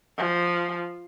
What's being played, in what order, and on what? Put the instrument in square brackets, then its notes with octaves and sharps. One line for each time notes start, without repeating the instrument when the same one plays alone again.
[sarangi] F3